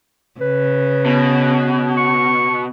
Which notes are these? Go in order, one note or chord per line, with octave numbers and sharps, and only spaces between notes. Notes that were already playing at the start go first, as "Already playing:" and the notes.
C#3 B4
B2
C#6